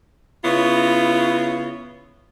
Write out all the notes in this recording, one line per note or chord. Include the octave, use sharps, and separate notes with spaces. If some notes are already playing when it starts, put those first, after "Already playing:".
C#3 B3 E4 F4 C#5